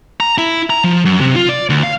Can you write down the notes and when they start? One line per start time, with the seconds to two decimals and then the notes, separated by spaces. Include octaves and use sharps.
0.20 A#5
0.38 E4
0.70 A#5
0.84 F3
1.05 F#2
1.21 C3
1.36 F4
1.49 D5
1.70 D2
1.83 F5